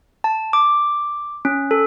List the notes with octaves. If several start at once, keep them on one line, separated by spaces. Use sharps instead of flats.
A5
D6
C#4
A4